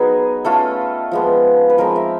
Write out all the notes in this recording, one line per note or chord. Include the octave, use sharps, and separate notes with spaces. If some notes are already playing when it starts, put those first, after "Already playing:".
Already playing: F#3 B3 D#4 F#4 G#4
A3 C#4 F4 A4
F3 G#3 B3
B4
F3 G#3 C4 A#4
E5